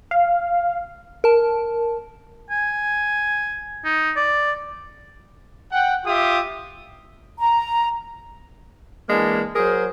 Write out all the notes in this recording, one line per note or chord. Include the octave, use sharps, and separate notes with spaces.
F5
A#4 A5
G#5
D#4
D5
F#5 G5
F4 G4 E5 D#6
A#5
E3 G#3 A#3 D4
F#3 G#4 A#4 C5